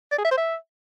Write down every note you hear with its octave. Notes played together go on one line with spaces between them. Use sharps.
D5
G#4
E5
C5
E5